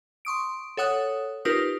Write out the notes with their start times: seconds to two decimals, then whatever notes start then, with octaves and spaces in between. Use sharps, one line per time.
0.25 C6 C#6 D#6 D7
0.77 A4 C#5 F#5 D#6 F#6
1.45 D#4 F4 G4 A#4 B4 D#6